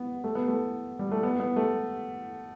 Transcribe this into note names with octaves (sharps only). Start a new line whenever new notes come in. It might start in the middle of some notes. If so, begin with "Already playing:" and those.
Already playing: B3
A3
B3
A3
G3
A3
B3
B3
A3